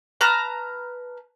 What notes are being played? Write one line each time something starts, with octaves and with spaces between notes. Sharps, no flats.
B4 A5 A#5 F6